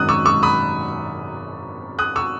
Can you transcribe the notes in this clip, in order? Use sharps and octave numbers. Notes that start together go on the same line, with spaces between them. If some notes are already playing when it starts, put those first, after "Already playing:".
Already playing: G#1 F#2 D#3 D#6 F#6
C#6 E6
C#6 E6
B5 D#6
D#6 F#6
C#6 E6